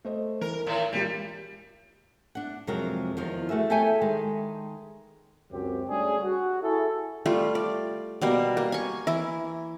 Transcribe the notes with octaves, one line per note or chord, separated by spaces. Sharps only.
A3 C5 D#5
E3 A#4
A2 D#3
A#2 G3 G#3
D4 F#5
F2 C3 F#3 G#3 C4 A#4
E2 D#3 F3 A#4
A3 F#4 G#4 E5
G4 A4 C#5 E5 G5 G#5
D#3 G#3
C#2 F#2 C4 G4
G3 A3 C#4 D4 G#4
F#4
E4 G#4 A4
G3 A3 F4
D5
B2 G3 A#3
A#3
G#5 C#6
E3 E4